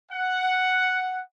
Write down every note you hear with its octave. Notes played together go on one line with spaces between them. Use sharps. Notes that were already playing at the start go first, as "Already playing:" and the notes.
F#5